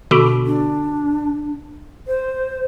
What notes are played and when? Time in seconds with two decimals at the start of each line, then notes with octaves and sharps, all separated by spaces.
0.11 B2 D3
0.46 D4
2.07 C5